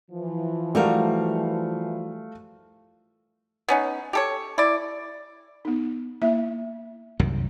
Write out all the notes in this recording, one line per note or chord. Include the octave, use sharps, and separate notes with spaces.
E3 F3
G3 A3 F#4 A#4 F5
B3 C#4 D#4
G4 A4 C#5
E4 D5
B3 D#4
A#3 E4 E5
C2 F#2 D#3